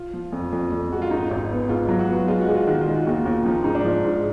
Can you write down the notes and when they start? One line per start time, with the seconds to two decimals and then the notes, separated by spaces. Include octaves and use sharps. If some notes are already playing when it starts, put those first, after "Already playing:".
Already playing: F4
0.14 F3
0.33 F2
0.53 F2
0.72 F2
0.91 G#3 F#4
1.02 F4
1.11 G#1 D#4
1.31 G#1
1.51 B3
1.69 G#2 F4
1.89 F#3
1.99 F#4
2.09 B3
2.28 G#3 F4
2.41 F#4
2.48 G#3
2.55 F4
2.67 D#3 F#4
2.81 F4
2.87 G#3
2.94 F#4
3.07 D#2 F4
3.25 D#2
3.46 F3 D#4
3.64 G#2 D#4
3.75 D4
3.85 F3
4.04 G#2